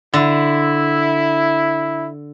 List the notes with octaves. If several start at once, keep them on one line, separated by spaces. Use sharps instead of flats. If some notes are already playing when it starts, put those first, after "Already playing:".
D3 E4